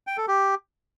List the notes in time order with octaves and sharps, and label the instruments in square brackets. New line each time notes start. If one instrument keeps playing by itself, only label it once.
[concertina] G5
A4
G4